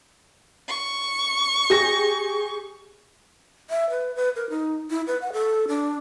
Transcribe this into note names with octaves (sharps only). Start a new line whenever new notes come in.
C#6
G4 G#4 A#6
E5
B4
B4
A#4
D#4
E4
B4
F#5
A4
D4